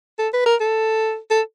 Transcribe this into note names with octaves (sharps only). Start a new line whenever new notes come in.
A4
B4
A#4
A4
A4